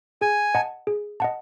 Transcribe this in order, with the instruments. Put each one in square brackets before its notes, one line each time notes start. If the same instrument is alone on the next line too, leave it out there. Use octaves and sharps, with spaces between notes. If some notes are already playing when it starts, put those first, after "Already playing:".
[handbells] G#4 [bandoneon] G#5
[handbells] D#5 F#5 A5
G#4
D#5 F#5 A5